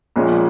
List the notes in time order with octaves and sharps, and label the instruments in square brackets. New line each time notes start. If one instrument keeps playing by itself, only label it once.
[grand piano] A#1 A#2 G#3 C#4